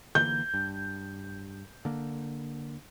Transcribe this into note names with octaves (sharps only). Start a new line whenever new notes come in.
D3 E3 A#3 G6
G2
D3 A#3